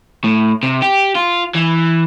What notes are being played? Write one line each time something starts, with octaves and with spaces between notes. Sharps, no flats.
A2
C3
G4
F4
E3